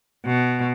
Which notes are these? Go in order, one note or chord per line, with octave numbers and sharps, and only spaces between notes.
B2